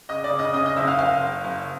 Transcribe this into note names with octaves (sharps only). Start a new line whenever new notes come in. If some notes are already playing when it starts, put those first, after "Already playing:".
C#3 D#5 D#6
D5 D6
C#3
D#5 D#6
C#3 D#5 D#6
D#5 D#6
F#1 E5 E6
F5 F6
F#1 F5 F6
F#1
F#1